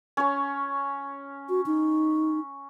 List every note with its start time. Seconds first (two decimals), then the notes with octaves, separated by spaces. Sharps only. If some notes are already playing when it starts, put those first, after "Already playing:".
0.17 C#4 C#5
1.49 F#4
1.66 D#4